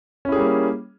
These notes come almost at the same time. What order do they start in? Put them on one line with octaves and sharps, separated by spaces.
C#4 E4 G#4 G3 A#3